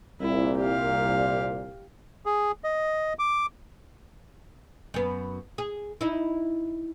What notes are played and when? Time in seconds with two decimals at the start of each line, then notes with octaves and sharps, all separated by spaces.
0.21 C2 A#2 E4
0.59 G4 F5
2.26 G#4
2.64 D#5
3.19 D6
4.94 F#2 B3
5.58 G#4
6.01 D#4 E4